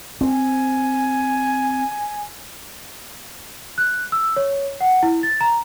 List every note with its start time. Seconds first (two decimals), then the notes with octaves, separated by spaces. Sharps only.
0.21 C4 G#5
3.78 F#6
4.12 E6
4.37 C#5
4.81 F#5
5.03 E4
5.23 A6
5.41 A#5